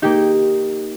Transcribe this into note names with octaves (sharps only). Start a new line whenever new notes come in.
A#3 D#4 G4